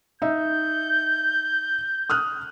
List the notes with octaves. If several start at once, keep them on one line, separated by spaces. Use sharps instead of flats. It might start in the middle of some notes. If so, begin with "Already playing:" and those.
D#4 E5 G6
D#6 F6 F#6